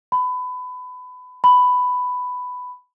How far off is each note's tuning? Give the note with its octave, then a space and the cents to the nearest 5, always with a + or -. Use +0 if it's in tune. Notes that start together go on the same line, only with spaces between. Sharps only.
B5 +25
B5 +10